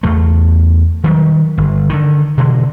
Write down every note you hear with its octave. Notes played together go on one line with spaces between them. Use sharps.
E2 A3
D#3 F#3 G3
G1
D3 D#3
B2 D3 E3 G#3